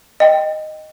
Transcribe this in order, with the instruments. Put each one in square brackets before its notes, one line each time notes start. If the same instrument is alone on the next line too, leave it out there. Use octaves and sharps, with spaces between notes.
[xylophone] D#5 G5